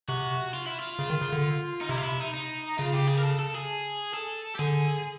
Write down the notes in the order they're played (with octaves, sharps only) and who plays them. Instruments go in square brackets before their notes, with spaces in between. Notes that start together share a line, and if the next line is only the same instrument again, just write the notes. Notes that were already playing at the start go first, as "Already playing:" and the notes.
[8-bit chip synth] C3 [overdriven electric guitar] F#4
[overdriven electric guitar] F4
E4
F4
[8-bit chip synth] C#3
D#3
C#3
D3
[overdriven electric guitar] D#4
[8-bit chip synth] C3 [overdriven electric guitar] E4
[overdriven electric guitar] F4
E4
D#4
D#4
[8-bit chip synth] C#3 [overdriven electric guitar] F4
[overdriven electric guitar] G4
G#4
A#4
A4
A4
G#4
A4
G4
[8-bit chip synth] D3 [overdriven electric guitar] G#4